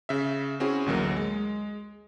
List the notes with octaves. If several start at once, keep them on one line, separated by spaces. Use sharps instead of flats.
C#3 E5
C4 C#4 E4 F#4 G#4
A1 D2 F#3 A#3
G#3